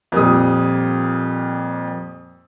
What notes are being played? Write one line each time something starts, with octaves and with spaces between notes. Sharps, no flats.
F2 A#2 G3 D#6